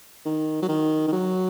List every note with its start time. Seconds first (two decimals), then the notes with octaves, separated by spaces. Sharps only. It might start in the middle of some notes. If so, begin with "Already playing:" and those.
0.25 D#3
0.62 F#3
0.68 D#3
1.08 D#3
1.12 F#3